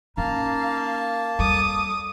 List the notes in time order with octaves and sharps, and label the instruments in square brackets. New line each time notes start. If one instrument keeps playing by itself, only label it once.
[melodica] A#3 A5 [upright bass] C#4 D#4 [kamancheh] F5 [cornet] A#5
[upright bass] E2 G3 [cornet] A4 [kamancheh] D6 D#6